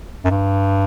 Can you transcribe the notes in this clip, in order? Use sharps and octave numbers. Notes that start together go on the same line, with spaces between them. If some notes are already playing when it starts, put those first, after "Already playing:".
F#2
G2